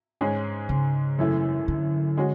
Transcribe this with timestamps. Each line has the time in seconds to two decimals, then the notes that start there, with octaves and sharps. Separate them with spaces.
0.21 G#2 G#3 C#4 G#4
0.69 C#3
1.19 F#2 E3 A3 E4
1.68 D3
2.17 G#3 C#4 F#4